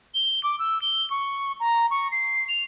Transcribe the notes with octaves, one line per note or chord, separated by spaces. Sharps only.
G7
D6
E6
G7
C#6
A#5
C#6
C7
F7